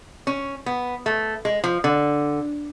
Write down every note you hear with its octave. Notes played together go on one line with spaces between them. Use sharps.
C#4
B3
A3
G#3
F3
D3